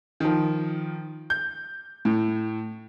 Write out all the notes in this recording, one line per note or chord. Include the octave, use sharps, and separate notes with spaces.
D#3 F3
G6
A2